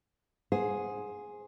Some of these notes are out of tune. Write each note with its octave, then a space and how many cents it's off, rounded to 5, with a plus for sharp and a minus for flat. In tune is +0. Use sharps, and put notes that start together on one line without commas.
G#4 +0 C5 +10 F#5 -25